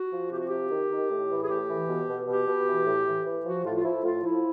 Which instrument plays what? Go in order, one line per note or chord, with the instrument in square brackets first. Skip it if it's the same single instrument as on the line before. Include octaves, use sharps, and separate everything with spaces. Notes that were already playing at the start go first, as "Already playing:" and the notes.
Already playing: [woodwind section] F#4
F3
C3 G4
F#4
C3 G4
D#3
D#3
A2
E3
G#4
A2 G4
E3
B2
B2
B2 G4
B2
E3
A2
E3
E3
F3 F#4
A2 F4
F4
F3 E4
A2 F4
F3 E4